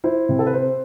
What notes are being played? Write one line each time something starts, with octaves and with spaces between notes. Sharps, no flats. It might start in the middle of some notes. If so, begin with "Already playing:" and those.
E4 C5
C3
A4
B4
C4 C5